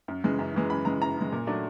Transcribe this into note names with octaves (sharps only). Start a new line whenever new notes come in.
F#2
C#3 E3 G#3
F#2
C#3 E3 G#3
F#2 B5
C#3 E3 G#3 A#5
F#2 A#5
C#3 E3 G#3
A#2
F#3 A3 D4